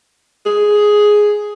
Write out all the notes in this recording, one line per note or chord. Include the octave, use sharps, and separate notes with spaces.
G#4